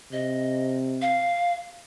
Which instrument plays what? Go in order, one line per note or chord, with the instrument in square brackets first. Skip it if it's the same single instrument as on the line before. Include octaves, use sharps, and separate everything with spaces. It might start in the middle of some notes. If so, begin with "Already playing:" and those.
[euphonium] C3 [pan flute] D#5
[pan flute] F5